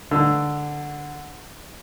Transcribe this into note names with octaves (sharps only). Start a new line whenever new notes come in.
D3 E6